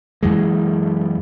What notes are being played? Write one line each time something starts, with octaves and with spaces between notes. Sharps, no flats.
F#2 E3 G#3